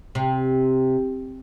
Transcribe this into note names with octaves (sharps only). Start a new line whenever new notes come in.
C3